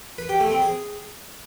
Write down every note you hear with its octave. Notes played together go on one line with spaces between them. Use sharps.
B4
G4
A3
C4
G#4